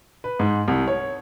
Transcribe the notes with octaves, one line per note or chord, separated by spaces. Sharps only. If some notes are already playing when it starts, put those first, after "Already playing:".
B4
G#2
C2
C#5